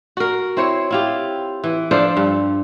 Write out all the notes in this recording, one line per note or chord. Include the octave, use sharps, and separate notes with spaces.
F#4 A#4
C4 E4 C5 C#5
E4 F4 G4
E3
F3 D4 A4 C5
G2